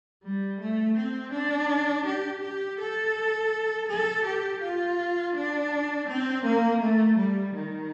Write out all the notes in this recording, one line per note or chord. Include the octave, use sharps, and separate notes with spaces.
G3
A3
C4
D4
G4
G4
A4
A4
G4
F4
D4
C4
A#3
A3
G3
D#3